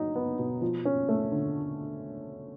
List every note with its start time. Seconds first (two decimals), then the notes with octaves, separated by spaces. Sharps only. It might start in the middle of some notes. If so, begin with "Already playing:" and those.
Already playing: F#3 D#4
0.15 B3
0.39 B2
0.61 F3
0.85 C#4
1.09 A3
1.32 D3